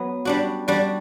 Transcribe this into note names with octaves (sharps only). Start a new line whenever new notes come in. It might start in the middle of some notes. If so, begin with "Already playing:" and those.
Already playing: F#3 B3
G3 D4 F#4
G3 D4 F#4